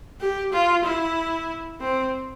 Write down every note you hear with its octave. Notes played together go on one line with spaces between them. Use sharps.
G4
F4
E4
C4